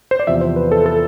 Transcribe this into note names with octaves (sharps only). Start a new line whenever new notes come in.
C5
D5
E2 C3 F3 E5
C5
B4
A4
A4